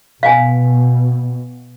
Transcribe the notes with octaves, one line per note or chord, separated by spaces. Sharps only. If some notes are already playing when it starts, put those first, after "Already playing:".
B2 F5 G#5